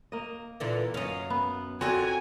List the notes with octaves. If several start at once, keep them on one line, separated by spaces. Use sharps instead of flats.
A#3 D#5
A#2 D3 E3
F#2 C#4 D#5 F5
B3
F2 D3 C4 C#4 F#4 A#4 G#5